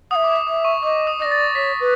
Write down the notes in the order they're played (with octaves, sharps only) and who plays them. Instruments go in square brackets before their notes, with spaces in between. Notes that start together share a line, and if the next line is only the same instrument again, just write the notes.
[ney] F#5 [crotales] D#6
[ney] E5
[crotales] D6
D#6
[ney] E5 [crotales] D6
[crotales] C#6
[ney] D#5 [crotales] D6
[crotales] D#6
[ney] D5 D#5 [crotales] A#6
[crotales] A6
[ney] C#5 [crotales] B6
[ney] B4